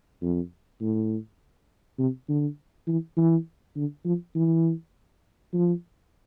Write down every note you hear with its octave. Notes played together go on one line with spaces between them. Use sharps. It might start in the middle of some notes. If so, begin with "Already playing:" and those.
F2
A2
C3
D3
E3
E3
D3
F3
E3
F3